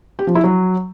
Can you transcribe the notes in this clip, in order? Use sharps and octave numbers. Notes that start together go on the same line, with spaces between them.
G4
F3
E4
F#3